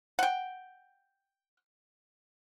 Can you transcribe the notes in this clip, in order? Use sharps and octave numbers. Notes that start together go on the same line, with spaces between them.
F#5 G5